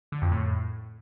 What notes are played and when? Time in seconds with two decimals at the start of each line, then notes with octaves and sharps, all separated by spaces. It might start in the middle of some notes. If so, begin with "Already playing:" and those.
0.12 D3
0.22 F2
0.32 A2